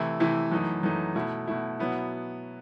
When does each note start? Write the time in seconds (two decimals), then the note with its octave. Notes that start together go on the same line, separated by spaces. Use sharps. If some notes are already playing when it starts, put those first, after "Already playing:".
Already playing: C3 E3 A3 E4
0.20 C3 E3 A3 E4
0.52 F#2 E3 A3 D#4
0.83 F#2 E3 A3 D#4
1.15 B2 A3 E4
1.48 B2 A3 E4
1.79 B2 F#3 B3 E4